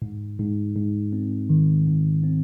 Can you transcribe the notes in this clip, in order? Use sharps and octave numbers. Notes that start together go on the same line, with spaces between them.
G#2
G#2
G#2
C4
D#3
G#2
C4